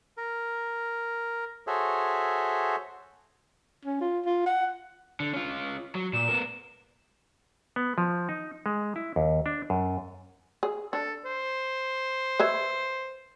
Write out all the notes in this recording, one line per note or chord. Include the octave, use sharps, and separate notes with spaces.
A#4
F#4 G#4 A4 C5 C#5 E5
C#4
F4
F4
F#5
D3
C#4 F4
F#3
A#2 E7
B3 A#4
B3
F3
D#4
G#3
E4
D#2
D4
F#2
G#4
D4 A4
C5
B4 C#5 E5